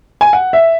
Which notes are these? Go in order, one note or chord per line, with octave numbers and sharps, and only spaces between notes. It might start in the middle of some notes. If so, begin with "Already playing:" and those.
G#5
F#5
E5